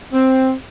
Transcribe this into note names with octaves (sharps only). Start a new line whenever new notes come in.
C4